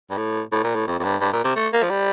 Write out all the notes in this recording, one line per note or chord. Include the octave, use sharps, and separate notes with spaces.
G2
A2
A2
A#2
A2
F2
F2
G2
G2
A#2
C3
A3
A#3
F3
G3